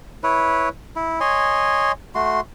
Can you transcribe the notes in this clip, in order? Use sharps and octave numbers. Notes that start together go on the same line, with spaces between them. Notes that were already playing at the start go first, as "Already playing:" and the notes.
E4 B4 C#5
E4
C#5 D#5 G#5 C6
A3 F#4 C6